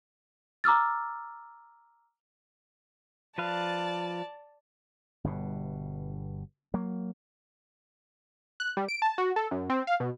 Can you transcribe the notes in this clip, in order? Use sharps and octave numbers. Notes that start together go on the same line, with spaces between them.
A#5 D6 E6 F6 A6
F3 B4 D5 F5 A5
G1 G2 B2
F#3 A#3
F#6
G3
D7
A5
F#4
A4
F#2
C4
F5
B2